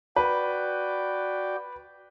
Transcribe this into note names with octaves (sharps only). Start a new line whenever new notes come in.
F#4 B4 D5 G5